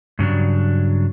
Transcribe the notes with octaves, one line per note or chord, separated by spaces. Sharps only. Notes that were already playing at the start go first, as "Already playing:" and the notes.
G2 C#3 F#3 D4